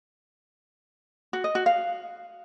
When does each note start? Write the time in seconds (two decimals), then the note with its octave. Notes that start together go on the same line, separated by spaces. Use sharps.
1.33 F#4
1.44 D#5
1.55 F#4
1.66 F5